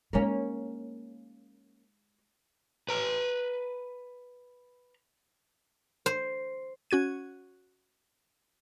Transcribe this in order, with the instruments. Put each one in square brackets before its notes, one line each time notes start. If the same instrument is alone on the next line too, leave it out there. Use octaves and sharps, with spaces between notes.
[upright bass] G#3 D#4 [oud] A#3 C#4
[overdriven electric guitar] B4 A#5
[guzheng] C5
[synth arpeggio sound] C#4 F#4 G#6 D#7